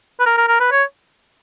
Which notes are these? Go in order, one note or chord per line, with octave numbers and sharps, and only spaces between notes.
B4
A#4
A#4
A#4
B4
C#5